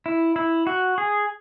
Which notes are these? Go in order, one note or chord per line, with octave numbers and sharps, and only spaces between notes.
E4
E4
F#4
G#4